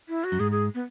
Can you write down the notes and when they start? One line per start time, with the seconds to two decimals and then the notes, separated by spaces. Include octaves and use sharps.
0.09 E4
0.24 F#4
0.32 F#2
0.40 G#2 G#4
0.51 G#4
0.74 B3